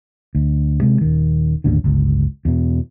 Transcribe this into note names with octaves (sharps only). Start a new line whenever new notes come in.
D2
C3 G#3
D#1 D#3
G1 D#2 A2 D3
G1 C#2
E2 B2